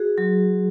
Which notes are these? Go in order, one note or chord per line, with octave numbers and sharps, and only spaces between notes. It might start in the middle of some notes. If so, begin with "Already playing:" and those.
Already playing: F#4 G#4
F#3